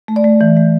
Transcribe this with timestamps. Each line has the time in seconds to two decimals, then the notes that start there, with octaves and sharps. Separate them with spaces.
0.08 A3
0.16 D5
0.24 A3
0.41 E3
0.57 A3